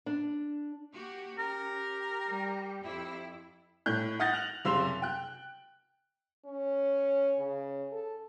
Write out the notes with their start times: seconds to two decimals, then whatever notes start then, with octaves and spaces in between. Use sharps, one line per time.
0.06 D4
0.95 A#3 F#4 G4
1.38 C#4 G4 A#4
2.26 G3
2.82 F2 E4
3.86 A2 F#6 G6
4.20 F#5 D#6 F6 G6 A6 A#6
4.33 F#6 F7 F#7
4.65 F#1 C3 F5 C6 E6 F7
5.02 G5 F#6
6.45 C#4
7.38 C#3
7.92 A4